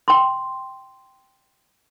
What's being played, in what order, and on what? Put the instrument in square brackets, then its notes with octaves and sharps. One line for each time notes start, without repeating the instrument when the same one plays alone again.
[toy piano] G5 C6